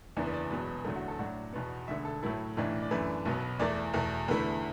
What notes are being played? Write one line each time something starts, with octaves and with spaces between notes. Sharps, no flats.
F#1 E2 E3 B3 D4
B4
D5
E1 E2 B2 F#3 B3 B4
E2 D3 F#3 A3 A4
F#4
A4
A2 F#3 D4 F#4
E2 B2 B3
E1 D2 D3 E5
A4
A2 F#3 A3 E4 A4
B1 A2 E3 D4
D5
F#2 E3 A3 D4 B4
B1 B2 F#3 B3
E2 E3 A3 D5
E2 B2 A3
E2 D3 A3 E4 B4